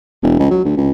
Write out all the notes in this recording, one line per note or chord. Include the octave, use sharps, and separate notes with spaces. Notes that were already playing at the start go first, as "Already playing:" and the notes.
E1
C#2
F#3
D2
C#2